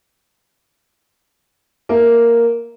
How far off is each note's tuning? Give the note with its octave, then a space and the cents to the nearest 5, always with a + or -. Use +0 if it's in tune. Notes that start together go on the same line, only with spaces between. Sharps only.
A#3 +0 E5 +0